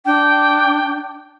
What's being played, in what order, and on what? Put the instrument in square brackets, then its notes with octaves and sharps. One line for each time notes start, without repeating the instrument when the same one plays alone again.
[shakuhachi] D4 [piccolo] G5